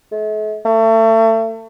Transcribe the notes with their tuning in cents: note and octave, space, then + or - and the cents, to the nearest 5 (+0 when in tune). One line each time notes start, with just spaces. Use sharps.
A3 -45
A3 +30